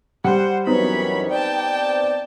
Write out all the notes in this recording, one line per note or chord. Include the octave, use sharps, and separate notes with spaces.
G3 C5 F#5
F#2 E3 F#3 B3 C4 D#4 C#5 B5
D5 G5 A5